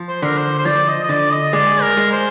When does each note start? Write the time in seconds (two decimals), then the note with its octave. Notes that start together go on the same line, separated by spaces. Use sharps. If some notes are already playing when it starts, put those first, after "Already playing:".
Already playing: F3
0.08 C5
0.22 D3 A#4
0.37 C5
0.58 C5
0.65 F3 D5
0.88 D#5
1.03 D#5
1.09 D3 D5
1.32 D#5
1.53 G#3 D5
1.82 A#4
1.97 G#3
2.12 C5